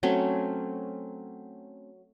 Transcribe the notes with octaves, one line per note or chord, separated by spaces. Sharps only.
F#3 A3 C4 C#4